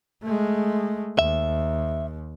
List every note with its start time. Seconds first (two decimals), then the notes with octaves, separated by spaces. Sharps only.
0.23 G#3 A3
1.19 D#2 E5